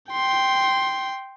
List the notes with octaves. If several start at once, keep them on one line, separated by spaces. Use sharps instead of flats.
G5 C6